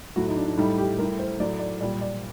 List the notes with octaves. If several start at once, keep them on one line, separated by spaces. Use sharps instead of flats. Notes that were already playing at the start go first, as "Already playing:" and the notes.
A2 F#3 F#4
D#4
D4
D4
A2 G3 D#4
G4
A2 G3 A#4
C5
A2 F#3 D5
D5
A#2 G3 D5
D5